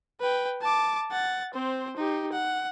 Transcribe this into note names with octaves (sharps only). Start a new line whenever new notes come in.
B4 G5
A5 D6
F#5 A6
C4 C5
D#4 G4
F#5